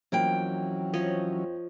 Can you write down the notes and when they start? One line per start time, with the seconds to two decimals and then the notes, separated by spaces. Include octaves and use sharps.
0.12 F2 E3 F#3 A#3 C#4 G5
0.94 F3 C#5 D#5